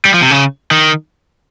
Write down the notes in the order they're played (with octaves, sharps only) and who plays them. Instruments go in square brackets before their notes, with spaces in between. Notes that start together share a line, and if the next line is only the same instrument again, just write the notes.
[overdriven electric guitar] G3
F3
C3
C#3
D#3